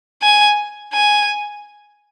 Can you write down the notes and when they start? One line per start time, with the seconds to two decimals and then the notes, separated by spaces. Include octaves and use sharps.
0.22 G#5
0.93 G#5